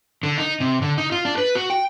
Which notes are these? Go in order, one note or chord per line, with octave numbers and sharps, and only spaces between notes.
D3
D#4
C3
D3
D#4
F4
D4
B4
F#4
G5